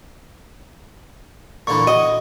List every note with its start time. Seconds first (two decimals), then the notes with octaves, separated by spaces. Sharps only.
1.67 A#2 D3 E3 C#6
1.87 F#4 D#5